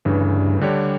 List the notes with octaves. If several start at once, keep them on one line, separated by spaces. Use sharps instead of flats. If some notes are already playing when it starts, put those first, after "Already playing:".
D2 G2 C#3 E3 A3
D3 G3 D4 G4 C#5